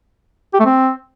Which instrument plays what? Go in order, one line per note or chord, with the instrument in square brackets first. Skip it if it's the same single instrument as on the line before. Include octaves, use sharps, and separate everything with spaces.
[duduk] G4
A3
C4